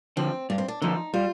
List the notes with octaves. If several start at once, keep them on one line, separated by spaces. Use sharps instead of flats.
D3 F3 C4
G2 D4
C4
D4
D3 F3 D#4
G3 F4